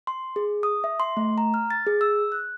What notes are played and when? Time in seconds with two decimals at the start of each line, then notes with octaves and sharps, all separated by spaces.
0.07 C6
0.36 G#4
0.63 D#6
0.84 E5
1.00 C6
1.17 A3
1.38 A#5
1.54 F6
1.70 A6
1.87 G#4
2.01 E6
2.32 F#6